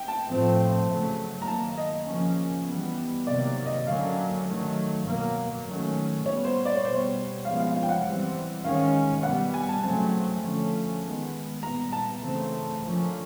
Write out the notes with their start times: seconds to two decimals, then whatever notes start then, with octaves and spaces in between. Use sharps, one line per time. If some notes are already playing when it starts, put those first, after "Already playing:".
Already playing: G5
0.08 A5
0.29 A2 F3 A3 C4
0.88 C#3 F#3 A3
1.42 A#5
1.48 D#3 F#3 A#3 A5
1.78 D#5
2.07 C#3 F3 A#3 C#4
2.67 E3 G3 B3
3.27 C3 D#3 F#3 A#3 D5
3.66 D#5
3.86 D3 F#3 A#3 C#4 F5
4.46 D#3 F#3 A3
5.06 B2 F#3 A#3
5.66 D#3 F#3 A3 C#4
6.25 A#2 G3 B3 C#5
6.45 C5
6.65 D5
6.76 C#5
6.84 B2 G3 B3 C5
6.95 C#5
7.45 C#3 F3 G#3 B3 F5
7.60 F5
7.74 F5
7.83 G5
7.89 F#5
8.04 E3 G3 C4
8.64 D#3 G#3 C#4 F5
9.23 B2 G3 B3 F#5
9.54 G#5
9.69 A5
9.83 C#3 F#3 A3 C4 A5
10.43 D3 F3 A3 C#4
11.03 D#3 G#3 B3
11.62 A#2 G3 B3 A#5
11.93 A5
12.22 C#3 E3 A3 C4
12.81 D3 F3 A#3 C#4